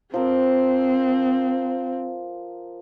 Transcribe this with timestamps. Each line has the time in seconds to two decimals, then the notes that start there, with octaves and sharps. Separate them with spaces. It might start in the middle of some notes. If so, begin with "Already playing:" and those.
0.14 F3 C4 A#4 C5